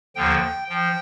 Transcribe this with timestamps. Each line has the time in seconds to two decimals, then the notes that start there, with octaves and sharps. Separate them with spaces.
0.16 D#2 D3 F3 G5
0.70 F3 G5